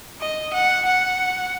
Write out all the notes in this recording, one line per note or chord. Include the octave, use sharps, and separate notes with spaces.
D#5
F#5
F#5